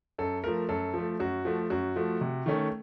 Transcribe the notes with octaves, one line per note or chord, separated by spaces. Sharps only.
F#2 A4
F3 A3 A#4
F#2 A4
F3 A3
F#2 F#4
F3 A3
F#2 F#4
F3 A3
C3
D#3 A3 C#4